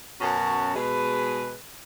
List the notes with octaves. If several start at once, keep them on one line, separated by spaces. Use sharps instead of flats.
F#2 B2 C#4 F#4 A5
B2 G#3 G#4 B4